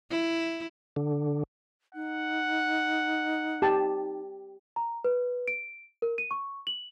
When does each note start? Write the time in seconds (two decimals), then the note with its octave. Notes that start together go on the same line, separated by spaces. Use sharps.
0.10 E4
0.96 D3
1.95 D#4 F#5
3.62 G4 A5
4.76 A#5
5.04 B4
5.48 D7
6.02 A#4
6.18 D#7
6.31 C#6
6.67 F#7